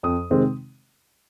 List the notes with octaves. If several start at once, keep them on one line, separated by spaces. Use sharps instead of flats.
F2 D#6
C3 D#3 G#3 C4